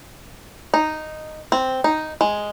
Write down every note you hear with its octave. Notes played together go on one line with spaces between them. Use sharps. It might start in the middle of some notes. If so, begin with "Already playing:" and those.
D#4
C4
D#4
G#3